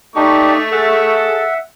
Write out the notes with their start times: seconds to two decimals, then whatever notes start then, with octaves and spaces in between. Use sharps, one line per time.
0.16 A3 D4 D#4 G4 C#6
0.72 G#4 A4 E5 F#5